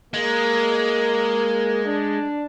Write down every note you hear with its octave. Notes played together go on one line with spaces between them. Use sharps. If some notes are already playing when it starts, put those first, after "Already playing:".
G#3 A#3
D4